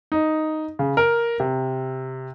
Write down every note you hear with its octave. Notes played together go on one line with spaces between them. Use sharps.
D#4
C#3
A#4
C3